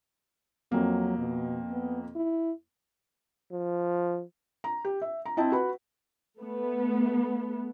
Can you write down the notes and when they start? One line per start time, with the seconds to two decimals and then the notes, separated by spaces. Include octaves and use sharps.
0.72 F2 F#3 A#3
1.17 B2
1.71 B3
2.16 E4
3.52 F3
4.64 A#5
4.85 G4
5.02 E5
5.26 A#5
5.37 C4 E4 D#5 A5
5.52 F#4 B4 B5
6.40 A3 B3